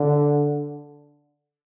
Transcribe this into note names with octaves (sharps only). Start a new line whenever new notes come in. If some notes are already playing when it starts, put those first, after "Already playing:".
Already playing: D3